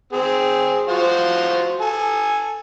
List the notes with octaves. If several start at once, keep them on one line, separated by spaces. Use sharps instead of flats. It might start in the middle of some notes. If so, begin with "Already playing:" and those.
C4 G#4
F4 F#4 C5
A4 G#5